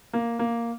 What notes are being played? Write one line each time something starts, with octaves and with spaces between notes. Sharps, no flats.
A#3
A#3